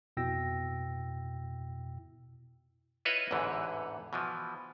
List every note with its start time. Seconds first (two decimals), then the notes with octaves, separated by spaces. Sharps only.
0.17 F2 B2 E4 G5 E6 A#6
3.05 E4 F4 B4 C#5 D#5 E5
3.31 A1 E2 G#2 D3 E3
4.13 B2 E3 F3